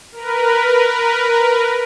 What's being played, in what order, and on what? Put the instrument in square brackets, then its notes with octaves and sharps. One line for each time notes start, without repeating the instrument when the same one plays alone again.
[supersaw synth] A#4 B4